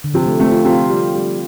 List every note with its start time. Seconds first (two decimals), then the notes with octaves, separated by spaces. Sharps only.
0.04 D3
0.14 C3 F3
0.26 A3
0.40 A3 C4
0.52 F4
0.65 C3 F4
0.90 G3
1.15 G3